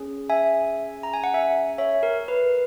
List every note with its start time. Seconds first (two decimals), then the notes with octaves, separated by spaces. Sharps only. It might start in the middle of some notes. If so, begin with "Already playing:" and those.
Already playing: C#4 G#4
0.30 E5 G#5
1.03 A#5
1.14 G#5
1.24 F#5
1.34 E5 G#5
1.78 C#5 E5
2.03 A#4
2.28 B4